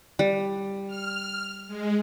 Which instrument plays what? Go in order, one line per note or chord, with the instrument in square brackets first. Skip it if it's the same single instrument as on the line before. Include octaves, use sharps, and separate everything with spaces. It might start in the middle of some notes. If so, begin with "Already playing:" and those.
[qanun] G3
[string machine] F6
G#3